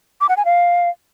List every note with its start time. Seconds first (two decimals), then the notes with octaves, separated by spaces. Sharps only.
0.21 D6
0.29 F#5
0.37 G#5
0.45 F5